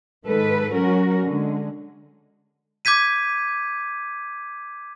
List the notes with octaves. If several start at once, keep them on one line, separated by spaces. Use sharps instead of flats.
G#2 D#3 A4 B4
F#3 C#4 F#4 A#4
D3 G#3
D6 G6 G#6 B6 D#7